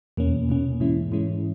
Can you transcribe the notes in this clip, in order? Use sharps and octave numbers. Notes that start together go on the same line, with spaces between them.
E2 B2 A#3 C#4
E2 B2 A#3 C#4
G#2 E3 G#3 C#4 E4
G#2 E3 G#3 C#4 E4